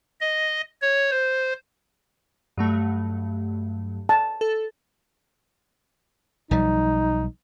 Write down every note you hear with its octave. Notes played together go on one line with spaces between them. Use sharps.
D#5
C#5
C5
G2 F#3 A3
A5
A4
B1 F3 G3 D#4